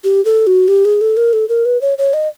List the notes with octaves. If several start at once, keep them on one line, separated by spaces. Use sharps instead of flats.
G4
A4
F#4
G4
G#4
A4
A#4
A4
A#4
B4
C#5
C#5
D#5